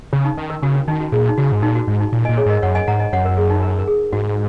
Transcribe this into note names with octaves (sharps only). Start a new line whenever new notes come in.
C#3 C#4
D#4
D#3
A#4
C#3 F#4
C#4
D#3 D#4
F#4
A#2 G#4
D#4
C#3 F#4
G#2
A#2 D#4
F#4
G#2
D#4
A#2
A#2 D#5 G#5
G#4 C#5
G#2 A#4 D#5
F#2 C#5 F#5
D#5 G#5
G#2 F#5 A#5
D#5 G#5
F#2 C#5 F#5
A#4
G#4
D#4
A#4
A#4
G#4
G#2 F#4